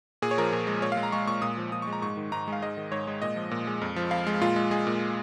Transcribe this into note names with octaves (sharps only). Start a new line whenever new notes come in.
A#2 G#4
C#5
F3 A#4
A#2
G#3
A#2 C#5
F5
G#3
A#5
G#3 C#6
A#2 C#6
A#2 D#6
F3
A#2 D#6
C#6
G#3
A#5
G#2 C#6
D#3
G#2 A#5
G#3
F5
G#2 D#5
D#3
G#2 C#5
G#3
A#2 D#5
F3
A#2
G#3
F2
F3
F2 F5
G#3
A#2 F4
G#3
G#3 G#4
A#2